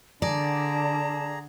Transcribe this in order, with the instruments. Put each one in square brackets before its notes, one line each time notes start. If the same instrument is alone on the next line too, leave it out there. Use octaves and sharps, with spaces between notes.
[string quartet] D3 [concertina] G#4 A#5 [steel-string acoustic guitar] D5 [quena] A5